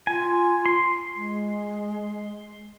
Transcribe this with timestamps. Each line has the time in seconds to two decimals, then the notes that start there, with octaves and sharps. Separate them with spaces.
0.07 F4 G#5
0.66 C6
1.16 G#3